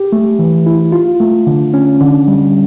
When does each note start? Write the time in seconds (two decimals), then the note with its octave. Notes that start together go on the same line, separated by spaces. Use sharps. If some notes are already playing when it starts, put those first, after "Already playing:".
Already playing: G4
0.12 A3
0.39 E3
0.66 E4
0.92 F4
1.20 A3
1.47 D3
1.74 C#4
2.01 D3
2.28 G3